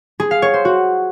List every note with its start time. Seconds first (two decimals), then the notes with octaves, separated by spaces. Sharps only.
0.20 G#4
0.31 F5
0.42 C#5
0.54 C5
0.65 F#4